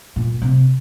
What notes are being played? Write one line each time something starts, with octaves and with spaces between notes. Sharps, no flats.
A#2
C3